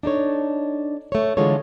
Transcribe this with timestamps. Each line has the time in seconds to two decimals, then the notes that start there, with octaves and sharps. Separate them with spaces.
0.03 D4 D#4 A4 C#5
1.12 A3 C#5
1.37 D3 E3 G#3 F4 A4 C#5